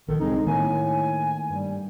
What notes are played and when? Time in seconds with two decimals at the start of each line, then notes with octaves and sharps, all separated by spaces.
0.08 A#1 D#3 A4
0.20 C2 G#3 C4 D#4
0.46 A2 D#3 A3 A#3 G#5
1.49 G2 G3